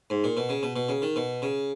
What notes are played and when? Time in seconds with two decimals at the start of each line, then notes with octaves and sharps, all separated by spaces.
0.10 G#2
0.24 A#2
0.37 B2
0.49 C#3
0.63 B2
0.76 B2
0.89 C#3
1.02 D#3
1.16 B2
1.42 C#3